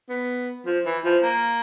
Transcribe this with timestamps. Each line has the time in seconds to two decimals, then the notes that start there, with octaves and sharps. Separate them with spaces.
0.09 B3
0.66 F3
0.86 E3
1.05 F3
1.23 A#3